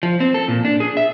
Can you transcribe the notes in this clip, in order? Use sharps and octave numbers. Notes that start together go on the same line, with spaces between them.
F3
C4
A4
A#2
D4
G#4
E5